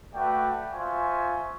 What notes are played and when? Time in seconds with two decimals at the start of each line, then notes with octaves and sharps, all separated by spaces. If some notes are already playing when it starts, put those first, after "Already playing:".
0.15 A3 F#4 B4 D5 G5
0.73 F4 C5 E5 G#5 C#6